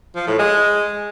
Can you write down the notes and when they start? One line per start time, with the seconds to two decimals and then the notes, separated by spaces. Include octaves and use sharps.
0.16 F3
0.27 A2
0.39 G#3